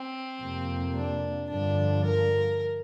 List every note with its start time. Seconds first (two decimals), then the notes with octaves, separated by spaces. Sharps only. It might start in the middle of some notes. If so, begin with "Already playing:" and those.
Already playing: C4
0.40 F2 C3 A#3
0.95 D4
1.49 G2 D3 F3 D4
2.04 A#4